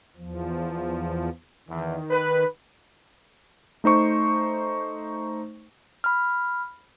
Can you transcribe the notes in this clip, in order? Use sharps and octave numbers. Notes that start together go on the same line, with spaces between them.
E2 F3
E2 D#3
B4
A3 D#4 C5 C#6
B5 F6